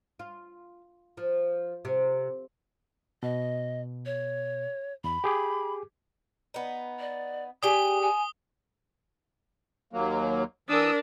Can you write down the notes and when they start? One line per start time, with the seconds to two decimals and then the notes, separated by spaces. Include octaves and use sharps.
0.19 F4
1.17 F3
1.85 C3
3.23 B2 D#5
4.06 C#5
5.04 E2 B5
5.24 G4 G#4 D6
6.54 B3 D#4
6.99 D5
7.63 D4 G4 G#4 G#5 D#6 G7
8.01 G#5
9.93 D#2 F#3 A#3
10.69 E3 D4 A#4 D#6 E6